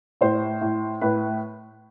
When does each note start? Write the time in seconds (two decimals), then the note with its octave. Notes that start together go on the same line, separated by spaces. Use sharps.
0.21 A2 C5
0.61 A2
1.01 A2 B4